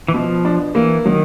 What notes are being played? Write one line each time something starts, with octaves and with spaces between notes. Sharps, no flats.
E3
B2 F3
D4
E3 A#3
D#3 F#3